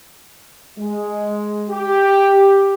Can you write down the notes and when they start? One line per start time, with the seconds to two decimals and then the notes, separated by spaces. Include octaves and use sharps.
0.79 G#3
1.70 G4